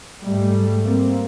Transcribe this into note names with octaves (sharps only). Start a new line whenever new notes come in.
G#2 G3 A3
A#3 C4